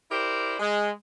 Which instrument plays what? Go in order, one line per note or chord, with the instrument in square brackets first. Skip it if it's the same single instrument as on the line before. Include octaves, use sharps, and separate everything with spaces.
[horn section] E4 G4 A#4 C5 D5
G#3